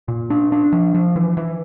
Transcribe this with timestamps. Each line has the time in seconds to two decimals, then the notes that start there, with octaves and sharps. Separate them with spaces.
0.08 A#2
0.30 D4
0.52 D4
0.73 F3
0.94 F3
1.16 E3
1.37 E3